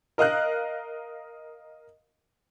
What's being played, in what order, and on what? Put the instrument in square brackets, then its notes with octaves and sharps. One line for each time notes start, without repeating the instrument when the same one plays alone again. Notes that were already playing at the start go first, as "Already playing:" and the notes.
[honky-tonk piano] A#4 D#5 F5 F6 F#6